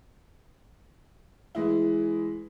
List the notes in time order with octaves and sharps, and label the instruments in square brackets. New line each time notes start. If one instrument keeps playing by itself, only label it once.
[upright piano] E3 G#3 E4